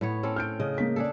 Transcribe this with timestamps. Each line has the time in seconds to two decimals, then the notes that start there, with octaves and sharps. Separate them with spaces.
0.01 A2 B3 C#5
0.23 C4 C#4 A4
0.36 F6 G6 D7
0.60 C#3 D#5
0.78 A#3 B6
0.96 D4 G#4 A4